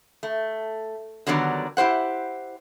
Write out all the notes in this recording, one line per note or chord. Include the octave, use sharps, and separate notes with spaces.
A3
D3 D#3 F#3 G3 B3 D5
E4 G4 C5 F#5